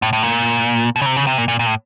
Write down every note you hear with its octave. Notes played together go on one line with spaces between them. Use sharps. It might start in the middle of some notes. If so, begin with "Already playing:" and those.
A2
A2
A#2
B2
C#3
C3
C#3
C3
A#2
A#2
A#2
A2